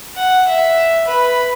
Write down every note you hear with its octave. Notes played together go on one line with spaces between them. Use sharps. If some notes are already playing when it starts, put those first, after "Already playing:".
F#5
E5
B4